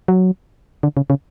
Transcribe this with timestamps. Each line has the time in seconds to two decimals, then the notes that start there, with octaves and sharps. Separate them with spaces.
0.08 F#3
0.83 D3
0.97 C#3
1.10 C#3